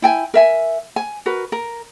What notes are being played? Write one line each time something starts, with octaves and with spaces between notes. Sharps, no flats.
E4 G5 G#5
A#4 E5 G#5
G#5
F#4 A#4 B4
A#4